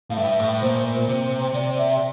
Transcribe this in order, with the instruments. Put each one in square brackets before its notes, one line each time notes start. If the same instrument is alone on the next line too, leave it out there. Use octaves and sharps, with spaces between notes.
[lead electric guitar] A2 [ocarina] F5
[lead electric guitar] G2 [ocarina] E5
[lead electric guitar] A2
[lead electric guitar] A#2 [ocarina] C5
[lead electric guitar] C3 [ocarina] C5
[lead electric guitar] C3 [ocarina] D5
[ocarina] E5